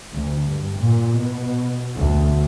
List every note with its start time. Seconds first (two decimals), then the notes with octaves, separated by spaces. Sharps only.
0.14 D2
0.49 G2
0.79 A#2
1.18 B2
1.96 D2